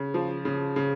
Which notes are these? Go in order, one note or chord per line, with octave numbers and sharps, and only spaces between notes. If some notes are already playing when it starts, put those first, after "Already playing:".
Already playing: C#3
F3
C#3
C#3